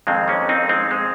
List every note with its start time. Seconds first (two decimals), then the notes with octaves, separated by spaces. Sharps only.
0.07 F2 D#3 G#3 C4
0.28 A#3 C#4
0.49 C4 D#4
0.69 G#3 C4
0.91 G#3